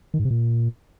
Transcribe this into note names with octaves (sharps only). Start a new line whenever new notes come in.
D#3
G#2
C3
A#2